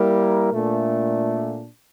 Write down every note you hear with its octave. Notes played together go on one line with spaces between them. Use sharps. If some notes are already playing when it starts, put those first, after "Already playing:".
Already playing: G3 A#3 E4 A#4
A#2 A3 D4